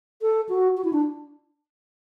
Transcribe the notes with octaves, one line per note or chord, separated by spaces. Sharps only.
A4
F#4
F#4
E4
D4